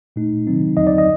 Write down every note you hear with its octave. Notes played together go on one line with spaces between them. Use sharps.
A#2 A3 D#4
C3 D#3 F#3 C4 D#4
D#2 D3 F#3 C4 D#4 D#5
D5
D#5